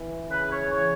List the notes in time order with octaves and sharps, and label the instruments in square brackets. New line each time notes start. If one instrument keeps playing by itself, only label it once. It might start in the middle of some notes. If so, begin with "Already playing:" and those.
Already playing: [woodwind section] E3
C#3 B4
C#5
E3 C#5